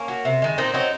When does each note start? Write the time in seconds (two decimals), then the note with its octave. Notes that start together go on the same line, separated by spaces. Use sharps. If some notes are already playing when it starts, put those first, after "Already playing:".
Already playing: A#3 C#4
0.08 F#3
0.25 C3
0.42 D#3 G#3
0.58 A#2 C4 D#4
0.74 F#3 C4 D#4